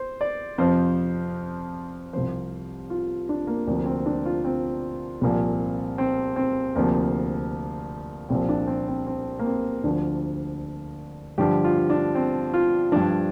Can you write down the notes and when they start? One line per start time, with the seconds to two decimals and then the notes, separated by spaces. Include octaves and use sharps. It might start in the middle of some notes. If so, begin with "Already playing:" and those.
Already playing: C5
0.21 D5
0.58 F2 C3 F3 C5
2.13 C2 C3 F3 C5
2.90 F4
3.29 D4
3.47 A#3
3.67 D2 C3 F3 A#3
3.86 C4
4.06 D4
4.25 F4
4.45 C4
5.21 C2 A#2 F3
5.98 C4
6.36 C4
6.75 D2 C3 F3 A#3
8.29 C2 A#2 F3 C4
8.49 D4
8.68 C4
8.88 C4
9.07 C4
9.39 A#3
9.46 C4
9.84 D2 D3 F3 D4
11.38 G2 D3 F3 G4
11.64 F4
11.90 D4
12.15 C4
12.54 F4
12.92 G2 F3 D4